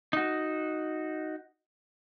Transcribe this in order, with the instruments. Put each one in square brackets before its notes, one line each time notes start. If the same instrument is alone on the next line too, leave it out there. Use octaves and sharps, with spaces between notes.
[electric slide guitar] D#4 F#4